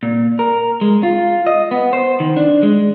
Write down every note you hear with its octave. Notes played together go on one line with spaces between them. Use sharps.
A#2
A#4
G#3
F4
D#5
B3
C5
D#3
D4
G#3